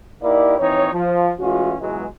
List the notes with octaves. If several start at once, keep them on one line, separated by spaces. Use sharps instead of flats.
A#3 D#4 E4 G4 A#4 D5
D#2 E3 C4 D#4 C#5
F3
A2 E3 G#3 C#4 F4 F#4
C#2 B2 E3 F#3 G#3